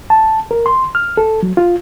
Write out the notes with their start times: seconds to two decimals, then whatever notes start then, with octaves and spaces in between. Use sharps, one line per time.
0.10 A5
0.51 A#4
0.66 C6
0.95 F6
1.17 A4
1.43 F#3
1.57 F4